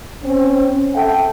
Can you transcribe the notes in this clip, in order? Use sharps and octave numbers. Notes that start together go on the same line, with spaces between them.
C4 C#4
A4 E5 F#5 G5